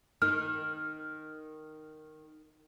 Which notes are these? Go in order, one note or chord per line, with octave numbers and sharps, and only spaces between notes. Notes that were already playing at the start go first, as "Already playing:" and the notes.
D#3 F6